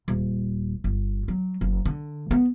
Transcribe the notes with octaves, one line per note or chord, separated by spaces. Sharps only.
D#1
G1
F#3
F#1
D3
B3